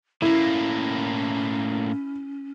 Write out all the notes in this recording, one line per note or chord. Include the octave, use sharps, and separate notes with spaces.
A2 A#3 C#4 E4